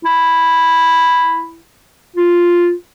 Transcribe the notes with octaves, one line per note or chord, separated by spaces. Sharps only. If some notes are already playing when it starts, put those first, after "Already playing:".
E4
F4